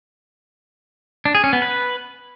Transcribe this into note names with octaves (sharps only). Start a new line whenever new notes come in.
D4
G#4
C#4
B3
B4